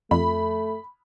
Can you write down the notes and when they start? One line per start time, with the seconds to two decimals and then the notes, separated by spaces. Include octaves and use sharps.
0.11 F2 A3 B5